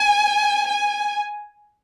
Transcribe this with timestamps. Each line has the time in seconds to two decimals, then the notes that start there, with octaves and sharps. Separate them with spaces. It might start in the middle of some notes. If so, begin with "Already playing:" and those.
Already playing: G#5
0.69 G#5